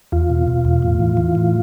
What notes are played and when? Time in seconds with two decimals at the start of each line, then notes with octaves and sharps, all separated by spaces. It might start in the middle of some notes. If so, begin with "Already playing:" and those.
0.12 E2 F4
0.30 B2
0.48 B2
0.65 E2
0.82 A2
1.00 E3
1.17 E3
1.35 A2